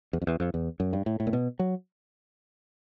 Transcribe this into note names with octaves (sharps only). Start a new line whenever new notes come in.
E2
F2
E2
F2
E2
F#2
G2
A2
A2
A#2
B2
F#3